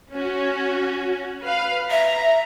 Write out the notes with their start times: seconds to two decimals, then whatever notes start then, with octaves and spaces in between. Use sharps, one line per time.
0.13 C#4 F#4
1.44 B4 F5
1.91 E5 A#5